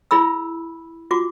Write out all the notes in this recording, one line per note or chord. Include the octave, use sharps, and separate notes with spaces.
E4 G#4 B5 E6
F4 F#4 D6